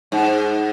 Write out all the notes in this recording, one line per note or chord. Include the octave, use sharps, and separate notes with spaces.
G#2